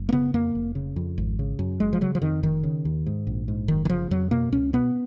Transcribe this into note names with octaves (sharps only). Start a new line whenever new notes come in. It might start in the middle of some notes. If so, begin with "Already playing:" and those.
Already playing: F#1
A#3
C#3 B3
F2 A#3
F1
C#3
F2
G#1
C#3
F#2
F#1 G#3
F3
C#3 F#3
F3
F2 D#3
F1 D#3
C#3
D#2
G#2
A#1
G#2
F#1 D#3
D#3
C#3 F3
F2 F#3
B2 A#3
C#2 C#4
B2 B3